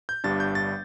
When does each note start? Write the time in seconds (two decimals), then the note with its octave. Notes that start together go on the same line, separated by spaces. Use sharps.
0.09 G6
0.24 G1 G2 G3 D4 A6
0.40 G6
0.55 A6